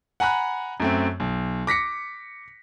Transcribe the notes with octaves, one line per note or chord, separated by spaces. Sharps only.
F#5 G#5 A#5 B5 F#6
F#2 A3 C4
B1
D6 A#6 B6 C#7